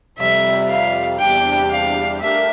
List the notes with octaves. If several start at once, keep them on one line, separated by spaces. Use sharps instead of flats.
F2 C3 G3 E5
F5
E2 C3 G3 D4 G4 G5
F5
A3 D4 G4 A#4 E5